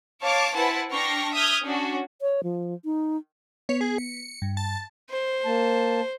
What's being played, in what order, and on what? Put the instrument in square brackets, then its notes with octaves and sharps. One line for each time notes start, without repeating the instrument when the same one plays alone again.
[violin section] C#5 F5 A5 C#6 D6 C7
E4 B4 C5 F#5 G#5 A5
D4 G5 C#6 F6 A#6 C7
E5 D#6 F6 G6 G#6
C#4 D4 F#4
[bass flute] C#5
F3
D#4
[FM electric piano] B3 [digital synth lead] C#5
[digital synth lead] G#4
C#7
[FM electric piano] G2
[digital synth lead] A5
[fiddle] C5
[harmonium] A#3 A5